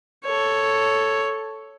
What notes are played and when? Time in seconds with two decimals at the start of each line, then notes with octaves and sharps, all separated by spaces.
0.25 A4 C#5